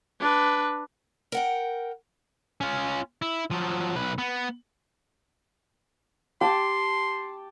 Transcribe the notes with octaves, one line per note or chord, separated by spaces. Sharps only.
D4 B4
A#4 F#5 G5
C#4 F4
E4
F3 F#3
B1 B4
B3
G4 G5 A5 C6